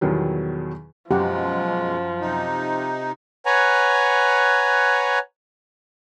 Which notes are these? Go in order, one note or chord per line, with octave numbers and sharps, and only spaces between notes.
E2 B2 D#3 F#3 G3
F#2 B2 F3 G#3 G4 F#5
C3 D#4
B4 C#5 F#5 G#5 A#5